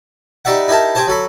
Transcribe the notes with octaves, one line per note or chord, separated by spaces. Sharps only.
G3 D#4 D5 E5 F#5
D#4 E4 G4 A#4 A5
C4 G4 G#4 C5 A5
F#3 A4 B5